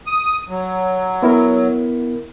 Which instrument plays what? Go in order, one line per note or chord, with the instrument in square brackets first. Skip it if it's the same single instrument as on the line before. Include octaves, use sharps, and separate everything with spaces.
[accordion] D#6
F#3
[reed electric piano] B3 E4 A#4